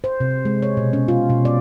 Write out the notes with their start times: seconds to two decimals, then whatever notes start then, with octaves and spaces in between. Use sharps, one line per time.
0.04 C5
0.20 C3
0.45 G#3
0.62 C#5
0.77 B2
0.93 C#4
1.08 F4
1.30 B2
1.45 D5